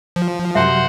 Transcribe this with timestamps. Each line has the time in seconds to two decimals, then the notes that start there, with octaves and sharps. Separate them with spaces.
0.16 F3
0.55 F#2 C3 C5 E5 F#5